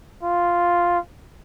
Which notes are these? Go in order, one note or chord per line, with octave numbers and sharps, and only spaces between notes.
F4